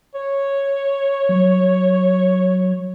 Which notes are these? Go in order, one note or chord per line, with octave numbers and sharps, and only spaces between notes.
C#5
F#3